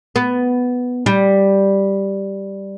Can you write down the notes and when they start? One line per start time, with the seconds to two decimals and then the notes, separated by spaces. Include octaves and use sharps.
0.16 B3
1.06 G3